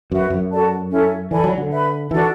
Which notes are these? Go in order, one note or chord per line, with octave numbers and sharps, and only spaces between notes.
F#2 F#4 B4 E5
F#2
F#4 A4 D5 A5
C#4 E4 A4 E5
E3 A4 D5 G#5 B5
F#3
D3
B4 E5 B5
E3 D4 F#4 A4